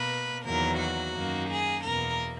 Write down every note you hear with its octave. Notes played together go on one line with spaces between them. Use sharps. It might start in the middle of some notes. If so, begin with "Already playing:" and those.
Already playing: B2 A#3 B4
E2 D#3 F#3 A#3 A#4
F#4
F#2 D#3 A#3
G#4
E2 B2 A#3 A#4